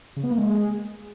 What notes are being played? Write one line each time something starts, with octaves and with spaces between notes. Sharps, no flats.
C#3
B3
A#3
G#3